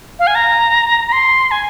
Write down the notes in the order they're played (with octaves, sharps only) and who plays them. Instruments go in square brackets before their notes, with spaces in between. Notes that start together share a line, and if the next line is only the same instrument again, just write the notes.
[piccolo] F5
G#5
A#5
A#5
C6
G#5